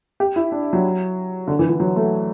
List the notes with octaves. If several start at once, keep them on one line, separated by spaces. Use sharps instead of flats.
G4
E4
D4
F#3
D3
E3
E3
F#3
A3